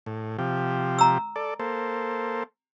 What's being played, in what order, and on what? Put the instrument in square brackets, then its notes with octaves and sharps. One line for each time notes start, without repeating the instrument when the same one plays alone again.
[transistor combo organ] A2
C3 F3 G4
[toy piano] A#5 E6
[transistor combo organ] A4 D5
A#3 A4 C5